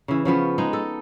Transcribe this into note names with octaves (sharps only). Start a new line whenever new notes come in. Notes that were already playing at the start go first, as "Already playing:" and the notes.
C#3 E3
C#3 F3 B3 C#4
G#3 D#4
A4